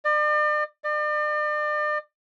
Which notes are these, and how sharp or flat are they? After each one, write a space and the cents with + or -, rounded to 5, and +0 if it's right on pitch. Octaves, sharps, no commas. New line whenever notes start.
D5 +40
D5 +40